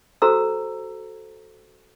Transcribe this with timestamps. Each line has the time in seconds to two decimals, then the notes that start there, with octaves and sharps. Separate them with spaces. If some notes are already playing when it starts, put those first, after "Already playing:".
0.22 F#4 A4 C5 A#5 E6